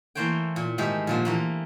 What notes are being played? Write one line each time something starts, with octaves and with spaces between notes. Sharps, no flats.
E3 A3 A#3 C5 C#5 G5
A#2
G#2 D#3 G#3 A3 G4
A#2 D3 F3
E3 A3 A#3